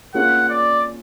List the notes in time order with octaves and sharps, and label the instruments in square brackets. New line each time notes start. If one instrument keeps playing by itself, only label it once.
[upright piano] A#3 C#4 F4 G#4 [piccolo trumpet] F#5
[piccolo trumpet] D5